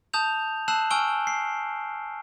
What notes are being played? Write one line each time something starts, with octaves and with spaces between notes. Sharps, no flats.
A5 D#6 G6 F7
A5 E6 F#6 C7 E7 F#7
G#5 C#6 E6 F6 D7 G7
C7